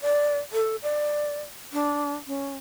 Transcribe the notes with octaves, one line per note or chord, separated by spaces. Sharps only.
D5
A4
D5
D4
C#4